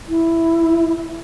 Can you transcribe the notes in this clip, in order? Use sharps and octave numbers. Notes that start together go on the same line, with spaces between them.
E4